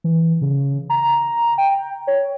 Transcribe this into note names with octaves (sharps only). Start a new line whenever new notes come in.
E3
C#3
A#5
G5
C#5